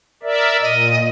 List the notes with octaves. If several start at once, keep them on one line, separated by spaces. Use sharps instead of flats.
A#4 D5 E5
A#2 D#5